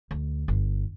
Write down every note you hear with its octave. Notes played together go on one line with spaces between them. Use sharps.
D2
G1